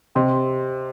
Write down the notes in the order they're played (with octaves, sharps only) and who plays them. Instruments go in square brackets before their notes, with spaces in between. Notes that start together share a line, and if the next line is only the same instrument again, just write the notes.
[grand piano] C3 [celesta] G4 C5 D#5 G5 C6